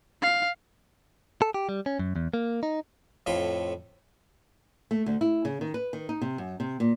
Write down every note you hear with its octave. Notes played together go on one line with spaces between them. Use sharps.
F5
A4
G4
G3
C#4
F#2
E2
A#3
D#4
F2 A2 F4 B5 C6
A3
D2
E4
C#3
D#3
B4
D#3
D#4
C3
F#2
C3
A#2